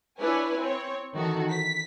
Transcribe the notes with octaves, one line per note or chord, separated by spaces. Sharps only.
D4 E4 B4 C#5 G#5
C4 C#5
D#3 E3 F#4 A4
B6